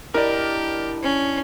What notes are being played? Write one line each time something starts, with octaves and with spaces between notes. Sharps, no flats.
D4 E4 G4 A#4 D5 D#5
C#4